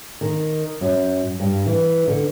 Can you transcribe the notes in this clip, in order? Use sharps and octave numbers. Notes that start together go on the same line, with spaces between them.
D#3
F#2
G2
E3
D3